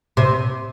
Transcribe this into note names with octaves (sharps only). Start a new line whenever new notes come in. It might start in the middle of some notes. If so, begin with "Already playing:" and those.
C3